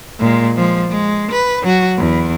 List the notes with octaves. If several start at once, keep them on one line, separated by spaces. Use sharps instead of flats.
A#2 G#3
F3 G#3
G#3
B4
F#3 F#4
E2